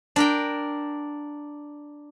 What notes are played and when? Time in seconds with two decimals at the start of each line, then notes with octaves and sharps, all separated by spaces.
0.16 D4 A#4 G5